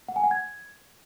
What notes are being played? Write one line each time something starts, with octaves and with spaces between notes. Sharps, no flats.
F#5
G#5
F#5
G#6